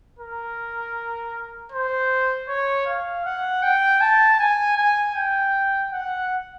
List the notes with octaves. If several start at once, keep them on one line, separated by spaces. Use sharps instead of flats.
A#4
C5
C#5
F5
F#5
G5
A5
G#5
G#5
G5
F#5